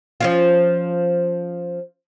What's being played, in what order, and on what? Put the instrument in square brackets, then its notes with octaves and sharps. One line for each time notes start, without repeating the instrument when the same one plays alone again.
[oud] F3 C#4 F4